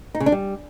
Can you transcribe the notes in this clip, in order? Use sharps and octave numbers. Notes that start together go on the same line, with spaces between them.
D#4
C#3
D4
G3